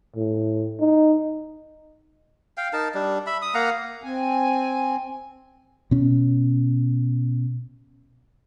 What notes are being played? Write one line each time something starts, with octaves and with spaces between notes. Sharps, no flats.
A2
D#4
F5 G5
D#4 A#4 A5
G3 D4
E5 B5
D#6
A#3 F5 F#5 A#5
C4 G#5
B2 C#4